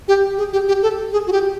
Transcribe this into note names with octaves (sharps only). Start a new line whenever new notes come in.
G4
G#4
G4
G4
A4
G#4
F#4
G4